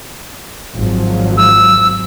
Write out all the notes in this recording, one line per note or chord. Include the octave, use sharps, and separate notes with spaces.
G#1 F3 F#3
E6